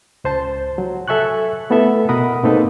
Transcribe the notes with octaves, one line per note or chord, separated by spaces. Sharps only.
C#2 C5 A5
F#3
A4 E5 G#5 C#6 F#6
A3 B3 E4 A4 E5
B2 A#4 F#5 B5 D#6
G#2 A#3 C4 D#4 A4 B4